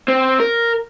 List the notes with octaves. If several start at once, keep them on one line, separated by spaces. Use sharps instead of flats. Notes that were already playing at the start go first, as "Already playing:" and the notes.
C4
A#4